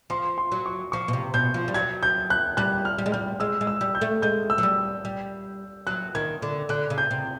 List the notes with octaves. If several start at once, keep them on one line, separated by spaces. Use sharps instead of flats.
F3 C6
C6
F#3
C#6
F3 C#6
B2
C3
B2 G6
F3
G3
F#3 G#6
G6
F#6
G3 F#6
F6
G3
G#3
G3 F6
G#3 E6
G#3
E6
G3
G6
A3
G#3 G6
E6
F#3
G3
G3
F#3 F#6
D#3 G#6
D3
D3 F#6
C#3
G6
C3